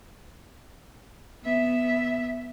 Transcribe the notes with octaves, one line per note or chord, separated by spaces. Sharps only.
B3 E5